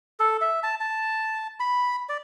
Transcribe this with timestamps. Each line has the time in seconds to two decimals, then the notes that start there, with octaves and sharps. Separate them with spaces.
0.20 A4
0.41 E5
0.63 A5
0.80 A5
1.60 B5
2.09 D5